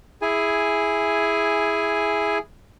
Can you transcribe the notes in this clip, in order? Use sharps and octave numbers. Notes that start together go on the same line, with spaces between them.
E4 G#4 G#5